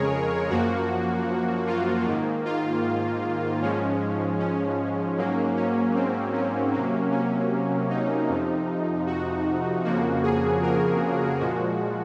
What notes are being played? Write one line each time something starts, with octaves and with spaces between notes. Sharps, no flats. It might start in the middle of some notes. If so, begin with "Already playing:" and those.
Already playing: F2 C#3 G#3 G#4 A#4 C#5
F#2 F3 A#3 F#4
F4
G#2 D#3 A#3
F4
G#2 F3 G#3 C#4
C#4
G#2 F#3 A#3
C#4
C4
C#4
C3 F#3 A#3
C#4
D#4
F2 C3 F3
F#4
F2 C#3 F3 A#3 F#4
G#4
A#4
A#2 F3 G#3 F#4